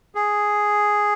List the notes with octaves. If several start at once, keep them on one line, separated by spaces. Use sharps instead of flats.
G#4